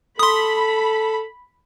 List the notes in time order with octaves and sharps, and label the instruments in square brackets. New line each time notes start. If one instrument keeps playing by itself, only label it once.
[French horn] A4 [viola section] B5 [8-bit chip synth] C6 D#6